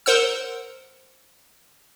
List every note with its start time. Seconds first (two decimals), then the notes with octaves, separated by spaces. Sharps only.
0.06 A#4 C5 F#5 E6